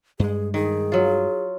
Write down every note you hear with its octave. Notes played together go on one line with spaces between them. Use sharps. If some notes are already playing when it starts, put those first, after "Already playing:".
G2 G#3 G#4
D#3 G#4
F#3 F4